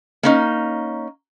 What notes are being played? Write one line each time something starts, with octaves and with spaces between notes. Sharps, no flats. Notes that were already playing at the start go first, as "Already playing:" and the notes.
A#3 C#4 D#4